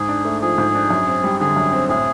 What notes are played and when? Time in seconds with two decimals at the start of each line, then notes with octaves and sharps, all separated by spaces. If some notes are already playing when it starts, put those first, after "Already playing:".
Already playing: G#2 G#4
0.09 D4
0.25 A3
0.42 F3 G#4
0.58 G#2
0.74 D4
0.90 F#2
1.07 C4
1.24 G3
1.40 D3 G#4
1.56 F#2
1.73 C4
1.89 A2 G#4